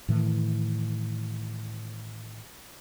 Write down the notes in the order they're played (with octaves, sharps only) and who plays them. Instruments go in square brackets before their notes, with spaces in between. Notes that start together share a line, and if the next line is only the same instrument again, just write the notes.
[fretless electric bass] A2 D#3 E3